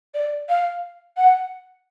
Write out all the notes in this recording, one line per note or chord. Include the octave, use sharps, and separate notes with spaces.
D5
F5
F#5